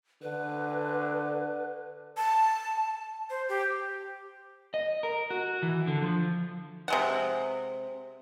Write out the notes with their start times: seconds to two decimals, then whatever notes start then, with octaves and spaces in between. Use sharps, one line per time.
0.22 D3 B4
2.17 A5
3.30 C5
3.49 G4
4.74 D#5
5.03 A#4
5.30 F#4
5.63 E3
5.87 D3
6.02 F3
6.88 C3 G#3 F#5